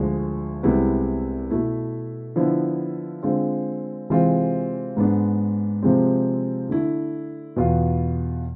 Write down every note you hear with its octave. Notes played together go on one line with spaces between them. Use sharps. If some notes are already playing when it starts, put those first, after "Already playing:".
Already playing: D2 D3 F3 G#3
C2 C3 G#3 B3 E4
B2 A3 E4
D3 F3 B3 E4
D3 G#3 C4 F4
C3 E3 G#3 C4 F4
G#2 G#3 B3 D4
C3 F3 G#3 C4
D3 A3 E4
E2 B2 B3 F4